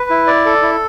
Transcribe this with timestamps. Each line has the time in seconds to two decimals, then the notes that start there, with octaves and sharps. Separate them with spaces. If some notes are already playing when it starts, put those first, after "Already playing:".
Already playing: B4
0.10 E4
0.27 D5
0.46 A4
0.62 E4